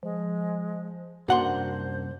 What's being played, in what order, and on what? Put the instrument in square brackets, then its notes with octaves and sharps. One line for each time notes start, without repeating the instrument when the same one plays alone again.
[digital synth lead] F3 [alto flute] G#3
[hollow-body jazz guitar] C2 F#5 C6 [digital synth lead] F#2 [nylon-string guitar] A#3 D4 F#4 [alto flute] C5